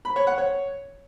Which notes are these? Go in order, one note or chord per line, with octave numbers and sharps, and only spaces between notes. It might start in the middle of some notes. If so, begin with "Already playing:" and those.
B5
C#5
F#5
C#5